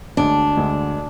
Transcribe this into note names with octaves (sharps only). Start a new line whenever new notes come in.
D2 D3 G#3 D4
D2 D3 G#3